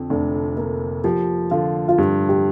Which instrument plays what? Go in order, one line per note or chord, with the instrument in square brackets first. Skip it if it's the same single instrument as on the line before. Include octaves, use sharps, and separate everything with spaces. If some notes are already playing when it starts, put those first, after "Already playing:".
Already playing: [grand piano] F2 D3
[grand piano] F1 [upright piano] D4
[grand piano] A#3 [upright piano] A#4
[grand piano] F3 [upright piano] G4
[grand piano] D3 [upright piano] F4
[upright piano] F4
[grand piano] G2 [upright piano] G4
[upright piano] G4